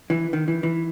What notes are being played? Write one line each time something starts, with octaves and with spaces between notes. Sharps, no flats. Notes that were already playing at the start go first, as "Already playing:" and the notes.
E3
D#3
E3
E3